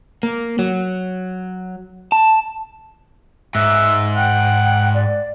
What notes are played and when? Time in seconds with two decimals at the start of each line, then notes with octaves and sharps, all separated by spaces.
0.23 A#3
0.59 F#3
2.12 A5
3.55 G#2 E5 F#6
4.16 F#5 G5
4.94 D5